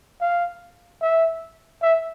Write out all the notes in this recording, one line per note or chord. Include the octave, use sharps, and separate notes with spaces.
F5
E5
E5